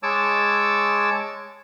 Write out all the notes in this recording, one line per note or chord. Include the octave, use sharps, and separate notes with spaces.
G#3 C#5 A5 D6 E6